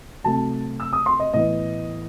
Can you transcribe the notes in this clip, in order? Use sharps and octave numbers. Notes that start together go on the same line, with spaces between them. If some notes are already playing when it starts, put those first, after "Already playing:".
C3 F#3 A3 A5
E6
D#6
C6
D#5
A2 E3 B3 D#5